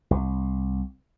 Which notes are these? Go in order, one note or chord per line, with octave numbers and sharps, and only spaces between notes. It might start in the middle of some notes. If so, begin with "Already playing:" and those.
C2